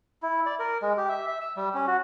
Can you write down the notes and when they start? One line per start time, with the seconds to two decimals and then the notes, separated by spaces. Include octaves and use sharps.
0.22 E4
0.46 D5
0.59 A#4
0.82 G#3
0.97 G4
1.09 E5
1.27 E5
1.41 E6
1.56 G3
1.74 C#4
1.87 F#4